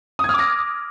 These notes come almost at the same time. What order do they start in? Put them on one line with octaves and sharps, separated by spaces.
D#6 G#6 F6 D6 A#6